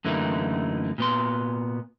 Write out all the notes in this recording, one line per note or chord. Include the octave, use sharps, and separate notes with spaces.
F#2 D3 E3 A3 A#3 D#4
A#2 B3 C6